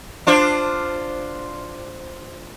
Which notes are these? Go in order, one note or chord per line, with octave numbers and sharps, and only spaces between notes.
D4 F4 C5